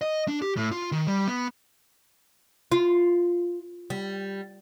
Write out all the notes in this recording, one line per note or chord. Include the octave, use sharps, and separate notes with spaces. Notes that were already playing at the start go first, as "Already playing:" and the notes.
D#5
D4
G4
A2
F4
D#3
G3
B3
F4
G3